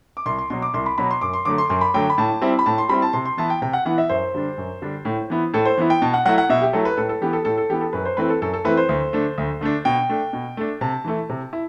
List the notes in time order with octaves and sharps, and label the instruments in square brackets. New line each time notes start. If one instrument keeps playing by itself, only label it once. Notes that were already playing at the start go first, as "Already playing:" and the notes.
[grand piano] D6
C2 C6
C6
B2 F#3 C6
D6
C2 C6
B5
B2 F#3 B5
C6
F#2 D6
C6
D3 F#3 A3 D6
C6
F#2 C6
B5
D3 F#3 A3 G5
B5
A2 A5
G3 C4 E4
B5
A2 A5
C6
G3 C4 E4 B5
A5
C3 C6
C6
E3 B3 E4 A5
G5
C3 G5
F#5
E3 B3 E4 F#5
E5
F#2 C5
D3 G3 D4
F#2
D3 G3 D4
A2
E3 B3 E4
A2 A4
C5
E3 B3 E4
G5
B2 A5
F#5
F#3 A3 E4 F#5
F#5
B2 E5
G4
F#3 A3 E4 A4
B4
A2 A4
A4
E3 B3 G4
A4
A2 A4
A4
E3 B3 G4
A4
F#2 B4
C5
E3 A3 C4 E4 B4
A4
F#2 A4
A4
E3 A3 C4 E4 B4
C5
D2
D3 A3 D4
D2
D3 A3 D4
B2 G5
A3 D4
B2
A3 D4
C3 A5
E3 A3 E4
C3
E4